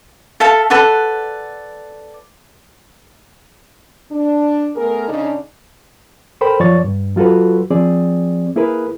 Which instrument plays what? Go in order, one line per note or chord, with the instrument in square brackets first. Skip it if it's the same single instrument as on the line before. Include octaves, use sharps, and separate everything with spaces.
[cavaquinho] A4 E5 F5 A5
A4 B4 D5 F#5
[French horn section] D4
A3 B3 G#4 A#4
C#3 D4 D#4
[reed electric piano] A4 A#4 C5 G5 B5
F#2 F3 C#5 D5 C#6 A6
G2
F#3 F4 F#4 A4 B4
F3 C4 G#4 D5
A#3 E4 G#4 A#4 B4